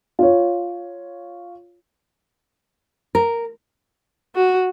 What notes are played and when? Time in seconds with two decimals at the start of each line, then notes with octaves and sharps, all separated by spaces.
0.19 F4 C#5
3.15 A#4
4.35 F#4